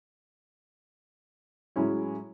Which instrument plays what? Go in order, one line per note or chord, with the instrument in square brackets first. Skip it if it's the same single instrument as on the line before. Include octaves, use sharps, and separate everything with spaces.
[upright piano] A2 F#3 G#3 C#4 E4